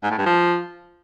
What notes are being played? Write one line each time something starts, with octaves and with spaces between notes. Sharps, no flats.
G#2
A2
G2
F3